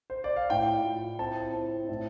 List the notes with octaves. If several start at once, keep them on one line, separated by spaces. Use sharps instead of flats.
C5
D5
F5
A2 G5
F4
C4 A5
C4
A2